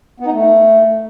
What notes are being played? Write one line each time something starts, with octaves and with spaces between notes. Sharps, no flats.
B3
D#4
A3